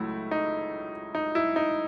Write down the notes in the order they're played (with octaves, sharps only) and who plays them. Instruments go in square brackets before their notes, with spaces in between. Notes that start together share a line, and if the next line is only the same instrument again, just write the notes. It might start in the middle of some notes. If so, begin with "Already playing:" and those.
Already playing: [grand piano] C#2 F#3 A3 E4
D#4
D#4
E4
D#4